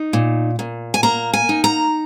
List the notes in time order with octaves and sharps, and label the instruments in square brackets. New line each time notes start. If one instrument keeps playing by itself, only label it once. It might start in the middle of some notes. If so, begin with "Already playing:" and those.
Already playing: [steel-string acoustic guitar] D#4
A#2
A#2
G#5
A#3 A#5
G#5
D#4
A#5